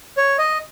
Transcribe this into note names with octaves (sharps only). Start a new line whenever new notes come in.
C#5
D#5